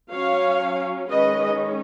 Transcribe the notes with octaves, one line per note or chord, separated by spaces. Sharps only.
F#3 C#4 C#5 F5
D#3 G#3 C#4 B4 D#5